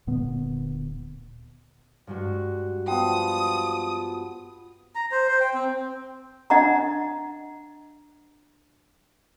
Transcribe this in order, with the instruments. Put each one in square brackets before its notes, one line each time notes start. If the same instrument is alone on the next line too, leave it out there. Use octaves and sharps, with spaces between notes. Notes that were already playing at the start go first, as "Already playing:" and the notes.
[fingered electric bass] D1 A#2 D3 B3
[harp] G2 G#3 F#4
[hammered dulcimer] F3 B3 [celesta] G5 [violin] D#6
[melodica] A#5
C5
C5
G5
C4
[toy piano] D4 D#5 F#5 A#5